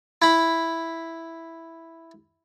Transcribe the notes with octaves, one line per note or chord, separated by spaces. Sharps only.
E4 B5